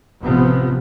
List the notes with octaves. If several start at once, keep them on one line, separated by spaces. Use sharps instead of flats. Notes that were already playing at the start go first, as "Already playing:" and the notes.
A1 C3 F3 B3